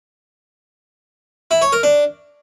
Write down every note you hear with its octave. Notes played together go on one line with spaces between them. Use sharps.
E4
C#5
A#4
D4